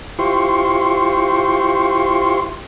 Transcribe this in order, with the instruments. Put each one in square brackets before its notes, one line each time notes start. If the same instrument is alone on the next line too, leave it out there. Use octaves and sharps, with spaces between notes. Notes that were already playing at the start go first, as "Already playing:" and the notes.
[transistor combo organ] E4 F4 G4 C5 C6 C#6